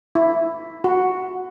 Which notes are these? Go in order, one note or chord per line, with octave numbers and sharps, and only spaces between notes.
E4
F#4